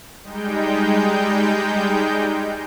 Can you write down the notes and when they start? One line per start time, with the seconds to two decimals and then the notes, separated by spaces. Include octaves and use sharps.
0.23 G3 G#3 D#4 G5 G6